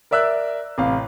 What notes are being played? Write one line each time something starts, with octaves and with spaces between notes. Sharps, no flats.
A#4 D5 E5 E6 F#6
A1 C3 F5